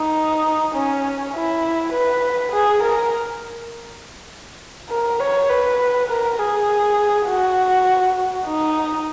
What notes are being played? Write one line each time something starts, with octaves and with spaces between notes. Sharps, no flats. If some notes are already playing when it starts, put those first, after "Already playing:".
Already playing: D#4
C#4
E4
B4
G#4
A#4
A#4
C#5
B4
A#4
G#4
F#4
D#4